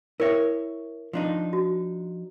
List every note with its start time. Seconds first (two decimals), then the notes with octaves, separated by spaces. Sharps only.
0.20 E4 A#4 C#5 E5
1.13 F3 D4 D#4
1.53 F#4